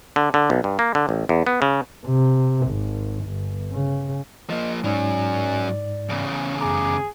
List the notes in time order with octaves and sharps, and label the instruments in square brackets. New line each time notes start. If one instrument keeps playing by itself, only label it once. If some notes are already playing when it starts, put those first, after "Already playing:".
[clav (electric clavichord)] D3
D3
B1
G2
A#3
D3
A1
E2
B3
C#3
[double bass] C3
G#1
G1
C#3
[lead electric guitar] F3 A#3 [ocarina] D#5
[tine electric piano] G#2 [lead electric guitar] F#3 C#4 [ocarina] D5 [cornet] G#5
[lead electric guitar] E2 C#3 [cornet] C#4
[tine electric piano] F#2 A#5 [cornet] G#4 [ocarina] D6